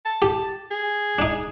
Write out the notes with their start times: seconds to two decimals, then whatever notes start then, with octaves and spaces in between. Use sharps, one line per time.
0.05 A5
0.22 G4
0.71 G#4
1.19 D4 D#4